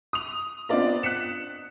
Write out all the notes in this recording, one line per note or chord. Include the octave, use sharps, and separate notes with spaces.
D#6 F7
B3 C4 D4 F4 D5 D#5
F#6 B6 C#7 E7